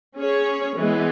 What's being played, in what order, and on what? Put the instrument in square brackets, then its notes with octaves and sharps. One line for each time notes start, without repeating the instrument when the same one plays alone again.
[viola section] C#4 G#4 C#5
E3 G#3 B3